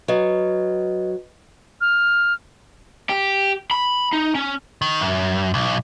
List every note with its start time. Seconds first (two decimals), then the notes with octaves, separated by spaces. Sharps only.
0.08 F#3 B4 D#5
1.81 F6
3.09 G4
3.71 B5
4.13 D#4
4.35 C#4
4.82 D#3
5.01 F#2
5.54 B1